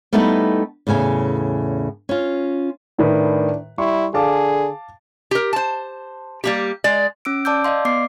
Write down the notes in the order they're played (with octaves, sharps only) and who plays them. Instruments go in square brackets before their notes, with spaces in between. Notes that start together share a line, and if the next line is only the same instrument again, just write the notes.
[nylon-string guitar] G3 A3 B3 D#4 E4 B4
E2 A2 C#3 G#5
C#4 F4
[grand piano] A2 D#3 B4 [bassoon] D4
[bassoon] G3 [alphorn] E4 [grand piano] C6 C#6
[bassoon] D3 [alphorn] G#4 [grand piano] F5 A5 D6
[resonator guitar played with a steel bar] G4 A#4
C5 A5
G3 A#3 G4
G#3 D5
[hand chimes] C#4 E6 D7
D5 A5 D6 E6 G6
D5 D#5 F5 C6
B3 D6 C7